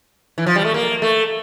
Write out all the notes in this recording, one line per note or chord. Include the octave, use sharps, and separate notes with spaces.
E3
F3
G3
A3
A#3
A3